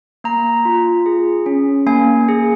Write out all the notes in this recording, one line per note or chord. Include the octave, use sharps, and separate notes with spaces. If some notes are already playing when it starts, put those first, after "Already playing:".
A#3 A#5
F4
G#4
C#4
A#3 G#5
G#4